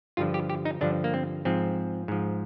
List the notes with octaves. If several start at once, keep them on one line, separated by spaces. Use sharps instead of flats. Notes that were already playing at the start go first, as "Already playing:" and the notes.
G2 D3 F3 F4
G4
G4
D#4
G2 D3 F3 D4
A#3
C4
G#2 F3 C4
G#2 F3